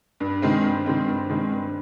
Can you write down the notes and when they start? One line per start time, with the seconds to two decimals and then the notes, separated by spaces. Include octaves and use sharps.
0.20 G2
0.42 D#3 G#3 C4
0.64 G2
0.86 D#3 G#3 C4
1.08 G2
1.29 D#3 G#3 C4
1.52 G2